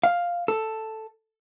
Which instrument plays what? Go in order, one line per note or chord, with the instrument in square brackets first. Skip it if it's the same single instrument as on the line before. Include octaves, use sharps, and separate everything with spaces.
[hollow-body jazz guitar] F5
A4